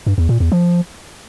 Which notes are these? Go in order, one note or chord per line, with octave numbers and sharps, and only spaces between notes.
G2
E2
A#2
E2
F3